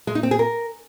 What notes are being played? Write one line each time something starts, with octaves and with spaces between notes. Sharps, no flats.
G#3
D#4
C4
G#4
A#4